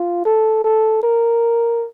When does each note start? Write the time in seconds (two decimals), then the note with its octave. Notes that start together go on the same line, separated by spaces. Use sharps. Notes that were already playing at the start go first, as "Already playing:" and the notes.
Already playing: F4
0.25 A4
0.64 A4
1.03 A#4